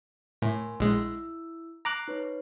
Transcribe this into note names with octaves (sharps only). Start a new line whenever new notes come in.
A2 A#4 G#5 C6
A#1 G#3 E4 E6
A#5 C#6 D6 F#6 C7 D7
D#4 B4 C#5